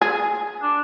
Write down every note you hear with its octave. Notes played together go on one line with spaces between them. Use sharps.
G#4
D4